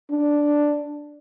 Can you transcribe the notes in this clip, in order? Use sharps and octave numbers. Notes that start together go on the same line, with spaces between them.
D4